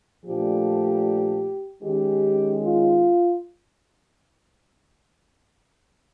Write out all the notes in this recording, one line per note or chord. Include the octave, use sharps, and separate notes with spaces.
A#2 F3 A3 D4 G4
D#3 G#3 C#4 G4
F4